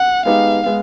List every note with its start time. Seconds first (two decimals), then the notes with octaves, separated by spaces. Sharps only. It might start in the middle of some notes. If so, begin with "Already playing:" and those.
Already playing: F#5
0.25 G#3 B3 D#4 G4 F5
0.65 G#3 B3